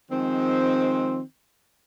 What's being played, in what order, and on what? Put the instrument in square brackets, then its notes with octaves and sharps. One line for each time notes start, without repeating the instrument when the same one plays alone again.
[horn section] D#3 F3 G#3 C4